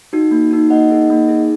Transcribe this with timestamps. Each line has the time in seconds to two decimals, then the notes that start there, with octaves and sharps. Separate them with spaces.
0.13 D#4 F#4
0.31 A#3
0.51 D#4 F#4
0.70 A#3 D#5 F#5
0.91 D#4 G#4
1.10 A#3
1.29 D#4 G#4